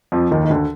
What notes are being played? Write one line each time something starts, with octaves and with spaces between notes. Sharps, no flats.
F2 F3
D#2 D#3
D#3
D2 D3